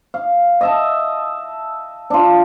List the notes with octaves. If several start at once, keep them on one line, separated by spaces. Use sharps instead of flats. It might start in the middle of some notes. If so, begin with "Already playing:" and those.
F5
D#5 E5 A5
D4 F4